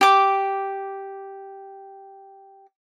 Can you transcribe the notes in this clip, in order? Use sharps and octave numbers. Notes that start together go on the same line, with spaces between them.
G4 D6